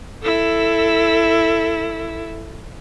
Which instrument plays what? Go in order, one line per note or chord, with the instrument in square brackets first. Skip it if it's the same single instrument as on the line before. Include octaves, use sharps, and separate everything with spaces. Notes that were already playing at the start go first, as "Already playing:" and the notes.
[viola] E4 A4